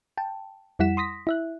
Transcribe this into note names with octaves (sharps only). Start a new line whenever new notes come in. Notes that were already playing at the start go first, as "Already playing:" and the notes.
G5 A5
F2 G3 E4 F#5 B6 E7
C6 D#6 A#6 B6
E4 E5 F#6